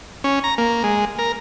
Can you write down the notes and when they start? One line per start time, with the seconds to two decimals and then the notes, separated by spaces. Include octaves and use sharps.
0.24 C#4
0.44 A#5
0.58 A#3
0.84 G#3
1.19 A#4